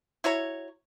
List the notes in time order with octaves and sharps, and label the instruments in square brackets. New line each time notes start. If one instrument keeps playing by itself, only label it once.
[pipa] E4 F#4 C#5 A#5